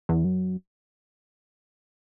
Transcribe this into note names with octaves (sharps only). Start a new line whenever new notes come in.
E2
F#2